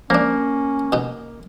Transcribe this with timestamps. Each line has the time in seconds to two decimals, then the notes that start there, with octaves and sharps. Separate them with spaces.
0.10 F3 A#3 C#4 D4
0.92 B2 D#4